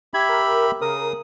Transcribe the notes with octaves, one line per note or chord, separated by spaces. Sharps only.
G4 E5 B5 G#6
A#4
C#3 A#4 D#6